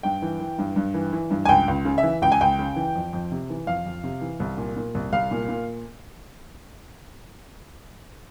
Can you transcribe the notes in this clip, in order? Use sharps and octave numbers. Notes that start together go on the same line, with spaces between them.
G2 G5
E3
E3
G2
G2
E3
E3
G2
G#5
C#2 G5
C#2
C#3
E5
E3
C#2 G5
G#5
C#2 G5
C#3
E3
F2
F2
C3
E3
F2 F5
F2
C3
E3
C2
A#2
A#2
C2
C2 F5
A#2
A#2